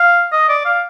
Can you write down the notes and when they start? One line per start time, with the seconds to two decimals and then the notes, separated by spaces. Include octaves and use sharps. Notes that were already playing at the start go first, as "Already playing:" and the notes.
Already playing: F5
0.33 D#5
0.49 D5
0.66 F5